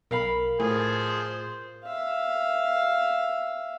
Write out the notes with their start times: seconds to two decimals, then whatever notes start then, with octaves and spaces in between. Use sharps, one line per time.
0.11 B1 A#4 F5 B5
0.60 A2 F3 G#4 C5 G#5
1.84 E5 F5